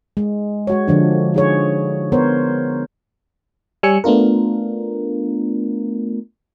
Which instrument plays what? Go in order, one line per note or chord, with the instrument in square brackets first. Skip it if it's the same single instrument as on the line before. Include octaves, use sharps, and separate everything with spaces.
[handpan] G#3
G#3 F#4 C#5
D3 F3 D4
D#4 G#4 C#5
B3 A#4 C5 C#5
[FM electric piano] G3 C#5 G#5 E6 C#7
A3 B3 D4 F4 A#4